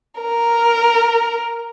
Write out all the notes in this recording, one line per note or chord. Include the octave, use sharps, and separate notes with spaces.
A#4